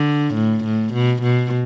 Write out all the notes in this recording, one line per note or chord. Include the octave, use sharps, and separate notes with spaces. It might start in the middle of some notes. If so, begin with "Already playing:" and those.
Already playing: D3
A2
A2
B2
B2